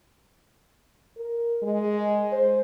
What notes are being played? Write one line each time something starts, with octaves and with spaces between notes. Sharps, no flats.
A#4
G#3
C5